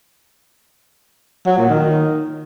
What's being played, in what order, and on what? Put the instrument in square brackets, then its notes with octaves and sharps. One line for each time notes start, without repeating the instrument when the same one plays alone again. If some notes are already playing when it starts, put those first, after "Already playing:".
[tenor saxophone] F#3
A#2
D#3